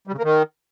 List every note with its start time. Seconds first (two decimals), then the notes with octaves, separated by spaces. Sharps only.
0.07 G3
0.13 C#3
0.18 A#3
0.23 D#3